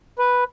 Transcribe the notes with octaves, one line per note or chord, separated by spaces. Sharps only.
B4